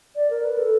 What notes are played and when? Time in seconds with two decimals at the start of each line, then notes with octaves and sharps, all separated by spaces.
0.15 D5
0.30 A#4
0.44 B4
0.58 A4